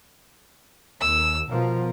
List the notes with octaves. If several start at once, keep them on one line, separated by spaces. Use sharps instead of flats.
D#2 E6
B2 F3 A#4